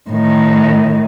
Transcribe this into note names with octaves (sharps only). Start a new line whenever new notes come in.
A2 D#3